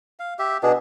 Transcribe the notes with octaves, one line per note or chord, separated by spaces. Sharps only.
F5
G4 E5
B2 D4 G#4